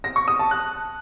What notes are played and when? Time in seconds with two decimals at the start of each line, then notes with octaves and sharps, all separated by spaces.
0.04 A#6
0.16 C#6
0.28 D#6
0.39 A5
0.51 F#6